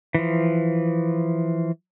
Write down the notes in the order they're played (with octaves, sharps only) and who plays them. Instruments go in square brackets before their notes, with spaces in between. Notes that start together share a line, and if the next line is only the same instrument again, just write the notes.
[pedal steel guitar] E3 F3